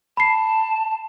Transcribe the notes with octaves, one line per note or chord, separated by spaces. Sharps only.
A5 B5 C7